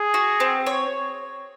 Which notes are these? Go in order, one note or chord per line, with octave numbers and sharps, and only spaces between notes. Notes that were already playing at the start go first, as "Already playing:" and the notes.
Already playing: G#4
F#4
C4
C#5